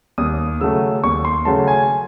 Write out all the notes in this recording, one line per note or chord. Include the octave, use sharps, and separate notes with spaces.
D#2 D#6
C#3 F#3 A3 E6
D#2 C#6
C6
C#3 F#3 A3 A5
G#5